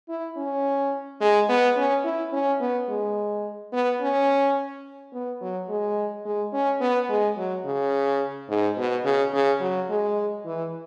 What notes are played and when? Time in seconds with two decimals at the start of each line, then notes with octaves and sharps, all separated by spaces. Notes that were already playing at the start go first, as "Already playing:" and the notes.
0.09 E4
0.37 C#4
1.21 G#3
1.49 B3
1.77 C#4
2.05 E4
2.33 C#4
2.61 B3
2.89 G#3
3.73 B3
4.01 C#4
5.13 B3
5.41 F#3
5.69 G#3
6.25 G#3
6.53 C#4
6.81 B3
7.09 G#3
7.37 F#3
7.65 C#3
8.49 G#2
8.77 B2
9.05 C#3
9.33 C#3
9.61 F#3
9.89 G#3
10.45 E3